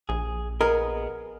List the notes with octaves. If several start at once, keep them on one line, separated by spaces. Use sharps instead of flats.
A#1 G#4
B3 G#4 A#4 D#5